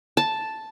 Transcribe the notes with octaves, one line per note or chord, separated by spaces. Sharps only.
A5